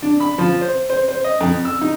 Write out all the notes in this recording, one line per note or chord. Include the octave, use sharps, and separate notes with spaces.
D4
B5
F3
C5
C5
C5
D#5
F2
E6
D#4